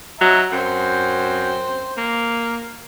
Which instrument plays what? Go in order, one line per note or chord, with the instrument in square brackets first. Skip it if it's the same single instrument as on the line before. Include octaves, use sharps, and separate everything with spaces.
[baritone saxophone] F#3 [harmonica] D#5 E5 A#5
[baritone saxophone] F#2 [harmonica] C5 G5
[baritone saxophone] A#3